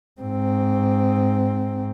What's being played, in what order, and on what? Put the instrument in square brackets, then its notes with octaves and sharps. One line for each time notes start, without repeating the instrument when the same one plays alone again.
[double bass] G#2 C4